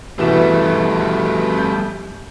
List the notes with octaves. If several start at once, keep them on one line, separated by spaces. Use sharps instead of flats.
B2 E3 G3 A3 E7
G6